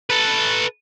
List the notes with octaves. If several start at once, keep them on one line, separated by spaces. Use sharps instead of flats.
A4 B4